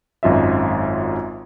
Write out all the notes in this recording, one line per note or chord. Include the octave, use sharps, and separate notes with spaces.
G#1 F#2 F4 D#5 E5